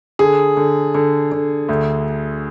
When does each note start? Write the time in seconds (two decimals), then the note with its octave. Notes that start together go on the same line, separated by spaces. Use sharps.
0.19 D3 G#4
0.57 D3
0.95 D3
1.32 D3
1.69 D2